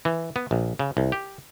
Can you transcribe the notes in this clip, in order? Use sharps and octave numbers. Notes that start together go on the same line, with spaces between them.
E3
B3
A#1
C#3
C2
G4